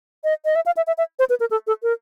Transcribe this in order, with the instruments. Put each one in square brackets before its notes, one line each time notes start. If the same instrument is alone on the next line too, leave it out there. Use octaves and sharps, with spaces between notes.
[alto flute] D#5
D#5
E5
F5
E5
E5
E5
C5
B4
A#4
A4
A4
A#4